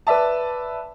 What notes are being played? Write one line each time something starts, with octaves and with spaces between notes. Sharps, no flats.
B4 D5 E5 A5